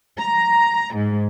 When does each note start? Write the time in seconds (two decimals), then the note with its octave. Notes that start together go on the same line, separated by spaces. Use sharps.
0.18 A#5
0.95 G#2